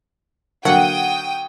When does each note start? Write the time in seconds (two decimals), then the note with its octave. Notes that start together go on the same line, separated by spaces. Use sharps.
0.65 D3 F#3 A#3 F#5 G5 D#6